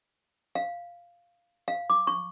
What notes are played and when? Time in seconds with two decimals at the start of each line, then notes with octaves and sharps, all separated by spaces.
0.55 F5
1.68 F5
1.90 D6
2.07 C#6